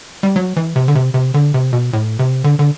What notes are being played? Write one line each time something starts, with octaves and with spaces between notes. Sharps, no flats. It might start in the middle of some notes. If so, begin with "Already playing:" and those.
G3
F#3
E3
C3
D3
C3
C3
D3
C3
B2
A2
C3
D3
D3